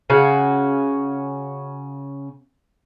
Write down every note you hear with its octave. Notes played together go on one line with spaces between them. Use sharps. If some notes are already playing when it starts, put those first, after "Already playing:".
C#3 C#4 F#4